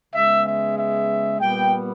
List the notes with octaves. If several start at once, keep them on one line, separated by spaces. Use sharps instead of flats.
C#3 G#3 B3 E5
E5
E5
A#2 G3 B3 G5